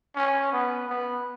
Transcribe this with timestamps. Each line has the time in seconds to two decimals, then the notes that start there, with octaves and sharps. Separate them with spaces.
0.15 C#4
0.52 B3
0.89 B3